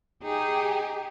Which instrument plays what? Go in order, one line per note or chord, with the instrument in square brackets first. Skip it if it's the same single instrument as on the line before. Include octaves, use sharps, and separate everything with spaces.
[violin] D#4 G4 [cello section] G#4